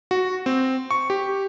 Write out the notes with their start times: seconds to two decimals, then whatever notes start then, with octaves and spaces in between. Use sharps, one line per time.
0.11 F#4
0.46 C4
0.91 C#6
1.10 G4